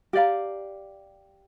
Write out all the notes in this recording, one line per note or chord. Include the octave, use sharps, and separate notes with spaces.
G4 D5 F5 A#5